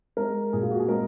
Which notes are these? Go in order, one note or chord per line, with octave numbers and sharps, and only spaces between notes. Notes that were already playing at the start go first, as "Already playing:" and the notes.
G#3 A#4
A#2 G#4
F4
F#4
G#4
G#3 A#4